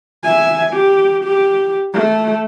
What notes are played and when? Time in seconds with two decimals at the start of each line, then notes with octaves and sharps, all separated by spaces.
0.23 E5 G#5
0.73 G4
1.24 G4
1.93 A3